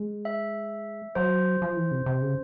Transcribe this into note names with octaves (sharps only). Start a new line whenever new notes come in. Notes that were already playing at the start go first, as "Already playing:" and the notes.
Already playing: G#3
E5
F#3 C5
F3
E3
C3
C3
C#3